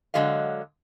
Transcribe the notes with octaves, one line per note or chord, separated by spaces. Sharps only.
D3 F#3 G#3 G#4 D#5 F5